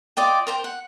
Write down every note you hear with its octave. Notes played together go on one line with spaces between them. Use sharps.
F4 D5 D#5 G5
A#4 C5 G5
F#5